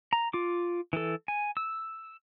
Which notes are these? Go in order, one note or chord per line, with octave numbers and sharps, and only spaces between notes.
A#5
F4 D6
E3 A4
G#5
E6